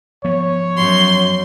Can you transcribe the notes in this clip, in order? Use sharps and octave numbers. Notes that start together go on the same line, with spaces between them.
F3 B3 C#5
F#2 C6